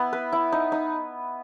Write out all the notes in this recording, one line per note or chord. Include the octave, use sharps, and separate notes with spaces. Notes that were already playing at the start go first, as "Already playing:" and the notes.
Already playing: B3 E4
B4
E4
D#4
D#4